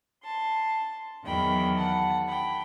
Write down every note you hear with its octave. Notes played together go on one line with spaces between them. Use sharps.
A5 C6
E2 D#3 F#3 G5 B5
F#5 A5
G5 B5